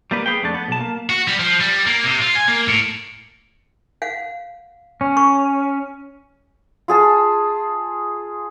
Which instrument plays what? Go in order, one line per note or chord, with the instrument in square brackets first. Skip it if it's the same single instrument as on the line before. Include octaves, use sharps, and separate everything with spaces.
[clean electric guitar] G3 A#3 B4
G#4 B4 F5 G5
F2 A3 D4 A5
B3
B1 A5
A#3
[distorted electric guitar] F#4
G3
F3
G3
A#3
C3
F4
G#5
A#3
A2
[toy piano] F5 F#5
[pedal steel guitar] C#4
[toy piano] C#6
[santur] F4 G#4 A5